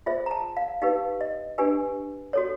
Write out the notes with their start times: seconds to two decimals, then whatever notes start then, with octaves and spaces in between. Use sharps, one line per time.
0.06 F4 G#4 C5 E5
0.26 A#5
0.31 A5
0.57 F5
0.82 D#4 G4 B4 F5
1.21 D#5
1.58 D4 G4 B4 G#5
2.33 F#4 A4 C#5